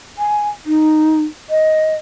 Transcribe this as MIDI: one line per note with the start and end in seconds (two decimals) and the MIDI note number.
0.18 0.47 80
0.66 1.22 63
1.49 1.93 75